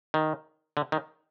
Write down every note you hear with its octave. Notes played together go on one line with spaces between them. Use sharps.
D#3
D3
D#3